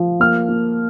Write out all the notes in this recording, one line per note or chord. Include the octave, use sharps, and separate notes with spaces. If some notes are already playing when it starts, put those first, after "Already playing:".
Already playing: F3
A#3 F6
A#3